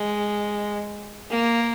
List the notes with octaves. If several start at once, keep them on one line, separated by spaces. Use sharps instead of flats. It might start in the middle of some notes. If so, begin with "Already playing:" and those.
Already playing: G#3
A#3